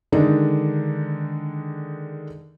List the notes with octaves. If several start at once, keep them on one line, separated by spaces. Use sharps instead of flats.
D3 D#3 G#3 D4 D#4